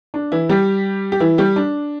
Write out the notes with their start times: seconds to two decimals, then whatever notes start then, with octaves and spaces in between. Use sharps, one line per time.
0.14 D4
0.32 E3 E4
0.49 G3 G4
1.12 G4
1.20 E3 E4
1.38 G3 G4
1.56 D4